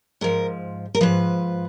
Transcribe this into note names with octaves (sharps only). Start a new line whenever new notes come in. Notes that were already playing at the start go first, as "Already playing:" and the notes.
G#2 F3 A#4
A#4
G#2 F3 B4